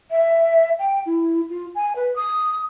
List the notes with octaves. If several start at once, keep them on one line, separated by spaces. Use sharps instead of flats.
E5
G5
E4
F4
G#5
B4
D#6